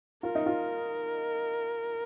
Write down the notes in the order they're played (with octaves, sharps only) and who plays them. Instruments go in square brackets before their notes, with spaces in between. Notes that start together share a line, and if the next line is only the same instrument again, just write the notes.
[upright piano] F4 [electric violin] A#4
[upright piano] D#4
F4